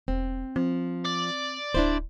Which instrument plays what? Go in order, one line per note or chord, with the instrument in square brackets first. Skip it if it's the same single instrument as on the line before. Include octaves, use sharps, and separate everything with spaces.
[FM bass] E1 [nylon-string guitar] C4
[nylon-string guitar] F3 [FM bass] C4
[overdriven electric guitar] D5
[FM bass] D1 [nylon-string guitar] D4 E4 C5